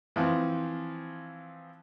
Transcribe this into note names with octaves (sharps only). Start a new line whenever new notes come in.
E3 F3 C4